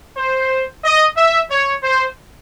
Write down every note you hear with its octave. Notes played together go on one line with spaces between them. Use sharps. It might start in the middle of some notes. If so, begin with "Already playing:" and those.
C5
D#5
E5
C#5
C5